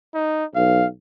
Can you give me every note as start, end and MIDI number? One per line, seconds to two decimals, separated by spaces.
0.14 0.45 63
0.56 0.86 35
0.56 0.86 77